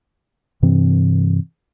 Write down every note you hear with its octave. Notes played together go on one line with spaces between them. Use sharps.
G2 C3 E3 C4